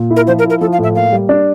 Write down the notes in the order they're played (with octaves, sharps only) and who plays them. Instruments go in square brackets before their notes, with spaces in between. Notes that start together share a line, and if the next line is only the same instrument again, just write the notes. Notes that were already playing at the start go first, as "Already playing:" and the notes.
Already playing: [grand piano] A#2
E4
[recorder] A#4
[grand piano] F3 [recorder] C5
[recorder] A#4
[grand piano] E4
[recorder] A#4
[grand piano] F3 [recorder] A4
[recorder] F5
[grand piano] A2 [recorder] E5
[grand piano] A#3 [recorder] F5
[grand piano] G3
D4